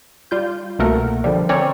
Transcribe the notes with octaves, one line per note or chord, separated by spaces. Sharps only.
G3 F4 G6
C2 B2 A3 A#3 A#4 F#5
D3 F3 G3
C4 C#4 A#4 C#5 D5